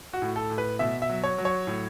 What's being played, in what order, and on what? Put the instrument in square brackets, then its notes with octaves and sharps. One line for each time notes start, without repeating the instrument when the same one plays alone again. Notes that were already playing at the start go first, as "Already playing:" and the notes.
[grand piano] F#4
A2
A4
A2
B4
B2 E5
E5
F#3
C#5
F#3
C#5
A2